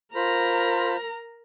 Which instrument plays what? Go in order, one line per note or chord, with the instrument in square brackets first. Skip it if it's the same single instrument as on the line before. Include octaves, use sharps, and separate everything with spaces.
[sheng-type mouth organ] F4 C5 B5 [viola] A#4 A#5